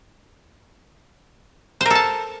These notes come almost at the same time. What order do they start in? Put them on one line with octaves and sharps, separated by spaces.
C5 A#4 A4 A5